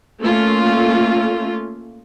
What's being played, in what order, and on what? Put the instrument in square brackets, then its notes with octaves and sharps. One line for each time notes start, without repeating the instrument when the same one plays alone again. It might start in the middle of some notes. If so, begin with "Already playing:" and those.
[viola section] A3 A#3 C#4 F4